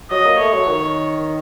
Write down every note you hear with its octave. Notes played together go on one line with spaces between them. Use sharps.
F#3 D#5
A#3
A3 C#5
F#3
D#3